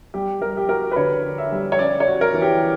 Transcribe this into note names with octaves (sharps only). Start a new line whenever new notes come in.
G3 G4
G3 A#4
G4
F#4 A#4
B4
D3 C#5
D3
E5
G3
C#5
C#4 D5
C#5
F#4
A#4
E3
G4